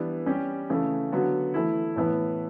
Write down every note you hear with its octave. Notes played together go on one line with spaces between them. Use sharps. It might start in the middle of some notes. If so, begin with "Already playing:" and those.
Already playing: E3 G3 B3 D4
G3 C#4 G4
C#3 E3 A3
D3 F#3 B3 F#4
E3 A3 E4
A2 E3 B3